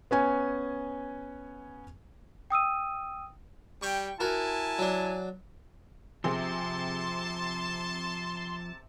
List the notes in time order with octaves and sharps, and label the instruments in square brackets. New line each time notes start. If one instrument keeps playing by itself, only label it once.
[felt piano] B3 C#4 G#5
[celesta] G5 D#6 E6 D#7
[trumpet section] G3 G5 [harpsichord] C#6
[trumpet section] E4 G#5 A5 [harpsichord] F#4 A#4
[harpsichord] F#3 D4
[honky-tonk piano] C3 C4 G#4 [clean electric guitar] F3 [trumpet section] A5 [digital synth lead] C6